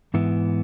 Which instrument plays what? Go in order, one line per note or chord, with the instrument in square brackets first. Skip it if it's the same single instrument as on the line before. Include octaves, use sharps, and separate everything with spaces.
[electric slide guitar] G#2 E3 B3 E4